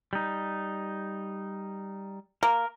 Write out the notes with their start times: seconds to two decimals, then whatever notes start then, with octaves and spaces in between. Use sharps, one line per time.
0.13 G3 D#4
2.43 A#3 A#4